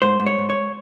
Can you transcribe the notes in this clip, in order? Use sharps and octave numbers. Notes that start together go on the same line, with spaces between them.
G#2 C5
G#2
C#5
G#2
C#5